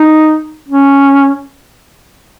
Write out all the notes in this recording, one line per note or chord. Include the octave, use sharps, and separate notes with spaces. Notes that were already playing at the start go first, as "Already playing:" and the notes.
Already playing: D#4
C#4